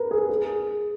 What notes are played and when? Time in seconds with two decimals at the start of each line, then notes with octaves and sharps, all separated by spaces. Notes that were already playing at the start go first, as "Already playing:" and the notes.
Already playing: A#4 B4
0.11 G#4
0.29 G#4